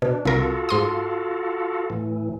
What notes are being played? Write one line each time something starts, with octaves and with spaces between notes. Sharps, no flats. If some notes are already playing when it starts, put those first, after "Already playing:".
B2 D4
C2 F4 F#4 A4 A#4
G#2 C6 D#6
A2 E3